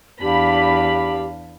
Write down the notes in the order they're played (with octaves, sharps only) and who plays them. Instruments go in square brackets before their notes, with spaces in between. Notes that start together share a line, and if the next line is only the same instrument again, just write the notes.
[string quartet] E2 D4 F5 [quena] G4 [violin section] B5